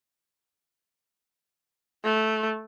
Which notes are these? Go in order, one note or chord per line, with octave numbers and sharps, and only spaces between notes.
A3